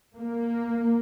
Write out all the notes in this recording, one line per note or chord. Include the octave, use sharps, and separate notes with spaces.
A#3